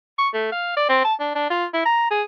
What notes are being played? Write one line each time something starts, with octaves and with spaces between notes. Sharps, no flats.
C#6
A3
F5
D5
C4
A5
D4
D4
F4
E4
A#5
G#4